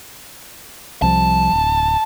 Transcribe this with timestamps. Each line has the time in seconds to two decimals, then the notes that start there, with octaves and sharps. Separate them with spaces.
1.02 C2 F3 G3 A5
1.53 D1